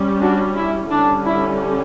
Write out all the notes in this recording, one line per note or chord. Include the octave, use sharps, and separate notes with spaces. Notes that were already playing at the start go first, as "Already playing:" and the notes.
Already playing: G3 C#4
D4 F#4
E4
D3 G3 C#4 D4
E4